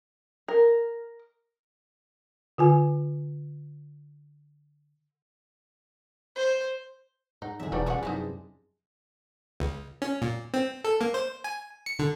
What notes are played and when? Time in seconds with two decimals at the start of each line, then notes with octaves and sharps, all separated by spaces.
0.48 A#4
2.58 D3 F4 G#5
6.36 C5
7.42 G#2 D#4 F#5
7.60 G1 E2 G#4 E5
7.72 E1 F3 G3 D#4 F#4 B4 D5
7.86 G3 G#3 C#4 G#4 C#5 F#5
8.03 F#2 C3 G#3 D#4 E4
9.60 C#2
10.02 C#4
10.22 A#2
10.54 C4
10.84 A4
11.01 A#3
11.14 C5
11.44 G#5
11.86 C#7
11.99 D3